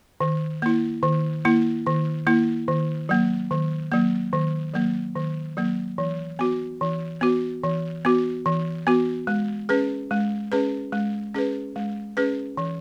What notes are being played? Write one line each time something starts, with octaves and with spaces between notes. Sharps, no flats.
D#3
A#3 E4
D#3
A#3 E4
D#3
A#3 E4
D#3
F#3 A#3
D#3
F#3 A#3
D#3
F#3 A#3
D#3
F#3 A#3
E3
B3 F#4
E3
B3 F#4
E3
B3 F#4
E3
B3 F#4
G#3
C#4 G#4 B4
G#3
C#4 G#4 B4
G#3
C#4 G#4 B4
G#3
C#4 G#4 B4
E3